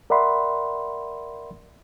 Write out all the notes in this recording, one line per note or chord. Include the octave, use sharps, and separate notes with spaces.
A#4 D5 E5 F#5 B5 C6